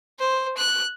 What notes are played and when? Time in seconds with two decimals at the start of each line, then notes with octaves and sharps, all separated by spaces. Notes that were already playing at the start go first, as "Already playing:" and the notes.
0.19 C5
0.57 F#6